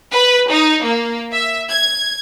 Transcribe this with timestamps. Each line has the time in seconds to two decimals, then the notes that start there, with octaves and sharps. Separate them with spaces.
0.12 B4
0.49 D#4
0.84 A#3
1.32 E5
1.69 G#6